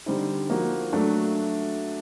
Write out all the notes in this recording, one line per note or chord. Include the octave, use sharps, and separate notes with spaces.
D3 G3 C4 D#4
F3 A#3 D#4 F#4
F#3 A3 D4 F#4